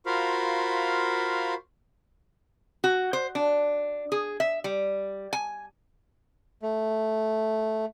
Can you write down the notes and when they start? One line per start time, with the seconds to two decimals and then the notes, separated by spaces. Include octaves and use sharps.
0.06 F4 F#4 A#4 C5 F5 B5
2.84 F#4
3.13 C5
3.35 D4
4.12 G#4
4.40 E5
4.64 G3
5.33 G#5
6.63 A3